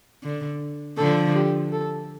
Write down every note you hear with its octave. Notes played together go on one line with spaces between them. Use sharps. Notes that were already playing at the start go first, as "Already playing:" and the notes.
D3
D3 F3 A4
G4
A4